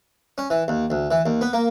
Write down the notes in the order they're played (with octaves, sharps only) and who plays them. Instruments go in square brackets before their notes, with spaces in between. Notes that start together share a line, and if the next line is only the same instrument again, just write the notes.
[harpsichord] C#4
E3
D#2
D2
E3
D#2
B3
A#3